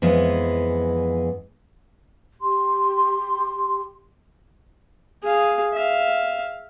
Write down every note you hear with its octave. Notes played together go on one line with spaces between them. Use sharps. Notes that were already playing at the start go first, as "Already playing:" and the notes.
F2 E3 G#3 B3
G4 C6
G#4 F5
E5 F5